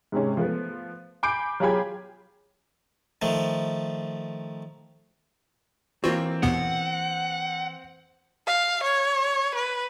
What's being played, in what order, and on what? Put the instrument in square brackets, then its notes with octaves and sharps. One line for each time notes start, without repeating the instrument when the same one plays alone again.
[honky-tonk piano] G#2 C3 G#3 C#4
F3 A3 B3
G#5 B5 D6 G6 C7 D7
F#3 F4 G4 G#4 B5 G#6
[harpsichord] D#3 F3 A3
[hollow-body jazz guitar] E3 A#3 [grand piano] C4 [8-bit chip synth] F4 F#4
[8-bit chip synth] D#2 B2 B3 [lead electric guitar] F#5
[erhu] F5
C#5
B4